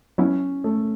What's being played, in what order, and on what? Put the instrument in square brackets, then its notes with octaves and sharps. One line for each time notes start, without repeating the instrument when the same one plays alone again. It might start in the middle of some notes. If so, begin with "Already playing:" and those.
[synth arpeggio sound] F#3 B3 E4 [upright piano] C#4
[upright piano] A3